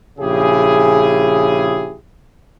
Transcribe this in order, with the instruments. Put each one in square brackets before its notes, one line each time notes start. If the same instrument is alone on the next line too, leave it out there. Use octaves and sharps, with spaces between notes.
[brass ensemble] A#1 C#3 E4 G4 G#4